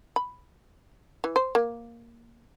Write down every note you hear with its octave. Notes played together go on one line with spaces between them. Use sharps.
B5
E3
C5
A#3